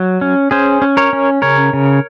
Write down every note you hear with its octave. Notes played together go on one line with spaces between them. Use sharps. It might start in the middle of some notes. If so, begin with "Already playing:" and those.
Already playing: F#3
C#4
C#4 G#4 C5
C#4
A#4 C#5
C#4
C#3 A#4 C#5
C#3